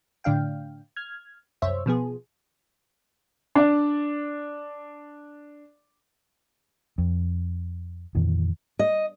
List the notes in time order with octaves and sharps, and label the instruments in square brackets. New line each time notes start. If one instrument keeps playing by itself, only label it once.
[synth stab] A2 D3 D4 F5 G5
F6 G#6
C2 F#2 C5 C#5 E5
B2 F3 B3 G#4
[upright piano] D4 D5
[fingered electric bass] F2
F2 A#2 D#3 E3
[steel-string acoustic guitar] D#5